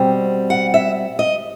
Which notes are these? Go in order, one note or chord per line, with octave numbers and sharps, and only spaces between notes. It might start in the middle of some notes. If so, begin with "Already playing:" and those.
Already playing: B2 G3 C4
F#5
E5
D#5